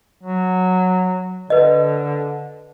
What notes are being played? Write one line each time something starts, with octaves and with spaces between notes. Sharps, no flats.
F#3
D3 B4 D#5